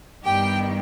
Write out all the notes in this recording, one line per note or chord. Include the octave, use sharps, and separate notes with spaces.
G2 D#3 G3 B3 G4 G5